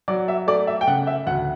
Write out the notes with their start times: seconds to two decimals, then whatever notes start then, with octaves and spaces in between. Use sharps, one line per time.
0.08 F#3 D5
0.28 E5
0.47 A3 D5
0.67 E5
0.81 G5
0.87 C#3 F#5
1.07 E5
1.27 D2 F#5